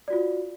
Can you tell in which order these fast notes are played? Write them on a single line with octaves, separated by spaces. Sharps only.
D5 F#4 F4